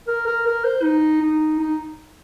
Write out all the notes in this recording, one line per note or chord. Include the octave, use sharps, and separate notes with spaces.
A#4
A#4
A#4
C5
D#4
D#4
D#4